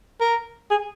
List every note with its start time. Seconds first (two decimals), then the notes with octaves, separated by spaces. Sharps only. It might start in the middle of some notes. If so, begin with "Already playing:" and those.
0.20 A#4
0.71 G#4